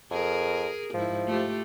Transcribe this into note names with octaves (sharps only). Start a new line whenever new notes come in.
F2 G#4 A#4
G#2 F3 E4
A3 F4 G4